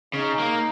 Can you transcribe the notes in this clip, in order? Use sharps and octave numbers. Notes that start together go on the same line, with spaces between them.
C#3 D#4
A#3